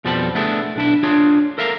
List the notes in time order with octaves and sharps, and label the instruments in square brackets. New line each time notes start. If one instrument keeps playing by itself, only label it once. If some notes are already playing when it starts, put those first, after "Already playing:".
[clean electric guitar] F2 B2 F3 G3 A4 B5
A3 B3 D4 E4 G#4 A4
B1 D4 E4
D4 F4 G#4 C#5
A4 A#4 E5 F5 A#5